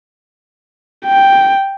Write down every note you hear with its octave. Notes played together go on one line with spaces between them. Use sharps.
G5